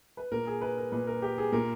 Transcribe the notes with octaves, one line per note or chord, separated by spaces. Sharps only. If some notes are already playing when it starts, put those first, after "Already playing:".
B4
A#2 A#4
G#4
B4
A#4
A#2 B4
A#4
G4
G#4
A#2 A#4